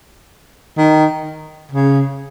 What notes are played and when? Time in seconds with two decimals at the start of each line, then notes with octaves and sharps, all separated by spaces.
0.78 D#3
1.72 C#3